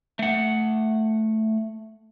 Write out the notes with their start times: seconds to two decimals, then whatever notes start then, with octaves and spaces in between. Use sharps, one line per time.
0.19 A3 F#5